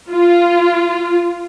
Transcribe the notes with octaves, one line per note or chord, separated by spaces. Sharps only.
F4